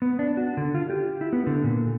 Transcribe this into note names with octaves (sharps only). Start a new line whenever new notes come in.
B3
D4
F#4
D3
F4
G4
E4
B3
D3
A#2